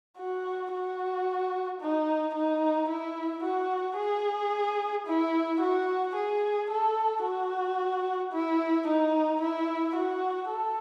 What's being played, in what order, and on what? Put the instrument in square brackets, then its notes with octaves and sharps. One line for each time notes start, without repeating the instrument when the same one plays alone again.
[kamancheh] F#4
F#4
D#4
D#4
E4
F#4
G#4
E4
F#4
G#4
A4
F#4
E4
D#4
E4
F#4
A4